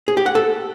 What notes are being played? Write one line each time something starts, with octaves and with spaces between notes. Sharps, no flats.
G#4
G4
F#5
A4